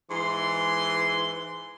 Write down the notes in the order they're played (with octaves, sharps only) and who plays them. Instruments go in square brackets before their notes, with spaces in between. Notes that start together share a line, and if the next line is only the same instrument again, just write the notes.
[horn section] G#2 E3 C6